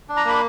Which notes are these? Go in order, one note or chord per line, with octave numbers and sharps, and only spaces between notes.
D4
A#5
A#3 B5